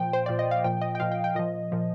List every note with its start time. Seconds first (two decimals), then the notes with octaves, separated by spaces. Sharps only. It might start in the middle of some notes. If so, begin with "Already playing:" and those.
Already playing: A#2 F3 G5
0.13 C5
0.26 A#2 F3 D5
0.39 D#5
0.51 F5
0.64 A#2 F3 G5
0.81 D#5
0.95 G5
1.00 A#2 F3 F5
1.12 G5
1.24 G5
1.35 A#2 F3 D#5
1.72 A#2 F3